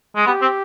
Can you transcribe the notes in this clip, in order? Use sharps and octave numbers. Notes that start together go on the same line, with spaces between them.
G#3
B3 G4
C4